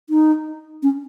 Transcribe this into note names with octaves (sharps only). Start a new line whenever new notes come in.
D#4
C#4